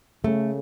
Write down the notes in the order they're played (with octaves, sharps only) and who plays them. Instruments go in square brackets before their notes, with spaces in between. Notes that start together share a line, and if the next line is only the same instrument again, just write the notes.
[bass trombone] C#3 [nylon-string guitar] A3